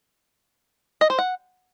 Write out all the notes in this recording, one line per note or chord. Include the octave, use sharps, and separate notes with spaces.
D#5
C5
F#5